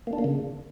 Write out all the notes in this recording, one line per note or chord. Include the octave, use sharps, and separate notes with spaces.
A#3
D4
A#3
C#3